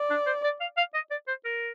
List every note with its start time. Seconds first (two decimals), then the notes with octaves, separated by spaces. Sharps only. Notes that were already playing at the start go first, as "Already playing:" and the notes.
Already playing: D5
0.10 D4
0.26 C5
0.44 D5
0.61 F5
0.77 F5
0.94 D#5
1.11 D5
1.28 C5
1.45 A#4